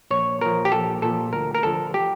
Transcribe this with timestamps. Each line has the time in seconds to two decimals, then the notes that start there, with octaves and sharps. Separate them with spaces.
0.10 A#1 C#5
0.41 A#2 F3 A#4
0.65 G4
0.72 A#1 A4
1.02 A#2 F3 A4
1.33 D2 A#4
1.55 A#4
1.63 D3 F3 A4
1.94 G4